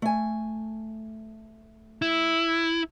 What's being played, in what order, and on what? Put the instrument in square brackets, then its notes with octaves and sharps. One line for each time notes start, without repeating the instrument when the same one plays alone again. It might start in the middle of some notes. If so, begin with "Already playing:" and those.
[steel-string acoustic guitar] A3 G#5
[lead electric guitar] E4